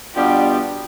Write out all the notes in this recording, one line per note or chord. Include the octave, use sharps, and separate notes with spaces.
B2 G3 B3 D4 F4 G4